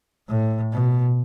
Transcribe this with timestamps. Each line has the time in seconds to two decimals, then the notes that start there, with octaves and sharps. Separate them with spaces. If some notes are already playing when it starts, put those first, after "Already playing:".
0.28 A2
0.72 B2